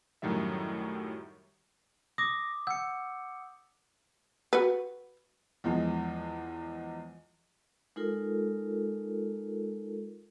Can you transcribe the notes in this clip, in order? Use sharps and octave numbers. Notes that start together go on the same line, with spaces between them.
F#2 A2 D#3 F#3 G3 E5
D6 D#6 A#6
F#5 E6 G6 C#7
F#4 B4
E2 F3 G#3
G#3 D#4 F4 A4 A#4